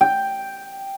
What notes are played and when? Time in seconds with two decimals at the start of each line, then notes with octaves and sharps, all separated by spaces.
0.01 G5